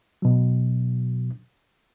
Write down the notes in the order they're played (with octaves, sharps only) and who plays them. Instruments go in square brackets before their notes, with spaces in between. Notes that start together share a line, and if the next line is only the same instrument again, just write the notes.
[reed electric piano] B2 F#3